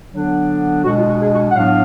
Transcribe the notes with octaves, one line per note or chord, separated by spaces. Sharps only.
D3 F#3 B3 D4
B2 G#3 D4 F#4
F4
F#4
G#4
F#4
F#5
A2 F#3 B3 D4 F5